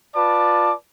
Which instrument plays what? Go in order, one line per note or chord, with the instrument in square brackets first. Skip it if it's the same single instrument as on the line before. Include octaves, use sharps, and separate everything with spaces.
[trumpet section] F4 B4 D5 A5 D6